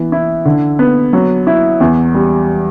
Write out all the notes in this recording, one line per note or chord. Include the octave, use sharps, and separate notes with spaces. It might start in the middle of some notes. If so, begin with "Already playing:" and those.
Already playing: E3 B3
E4
D3
B3
F#3
E4
E2
G3